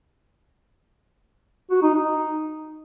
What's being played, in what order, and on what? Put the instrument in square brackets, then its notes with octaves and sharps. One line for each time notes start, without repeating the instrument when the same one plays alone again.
[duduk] F#4
D#4
D#4